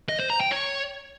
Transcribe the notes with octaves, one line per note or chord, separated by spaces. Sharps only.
D#5
C5
A#5
G5
C#5